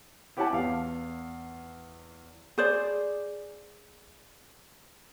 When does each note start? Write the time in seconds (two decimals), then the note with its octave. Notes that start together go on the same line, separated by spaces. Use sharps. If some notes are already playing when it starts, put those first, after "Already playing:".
0.37 E4 G4 C#5 F#5 G#5 A5
0.52 E2 F5
2.58 G#4 C5 D5